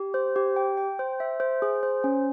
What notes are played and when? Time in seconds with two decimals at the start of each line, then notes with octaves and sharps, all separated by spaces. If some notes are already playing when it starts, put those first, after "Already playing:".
Already playing: G4
0.14 C5
0.36 G4
0.56 G5
0.77 G5
0.99 C5
1.20 E5
1.40 C5
1.62 G#4
1.83 C5
2.04 C#4